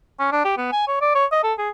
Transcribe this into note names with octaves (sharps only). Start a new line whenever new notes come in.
C#4
D4
G4
B3
G#5
C#5
D5
C#5
D#5
A4
G#4